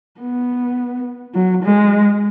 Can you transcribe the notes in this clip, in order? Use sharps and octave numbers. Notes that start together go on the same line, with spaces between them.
B3
F#3
G#3